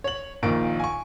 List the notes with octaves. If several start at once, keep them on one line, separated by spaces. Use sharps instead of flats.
C#5 F#7
A#1 A#2 D#3 F4 D7
G#5 C#6